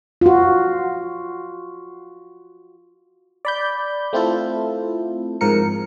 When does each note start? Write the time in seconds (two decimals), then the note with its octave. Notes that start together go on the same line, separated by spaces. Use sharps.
0.21 F4 F#4
3.45 D5 B5 G6
4.13 A3 C4 E4 F4 A4
5.41 G#2 F3 A#4 C#7